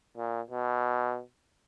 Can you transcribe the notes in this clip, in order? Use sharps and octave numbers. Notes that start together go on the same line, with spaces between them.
A#2
B2